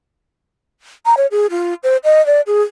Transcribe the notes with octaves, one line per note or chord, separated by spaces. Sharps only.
A#5
C#5
G#4
F4
C5
D#5
D5
G#4